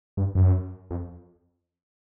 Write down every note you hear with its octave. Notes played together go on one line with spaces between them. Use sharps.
G2
F#2
F2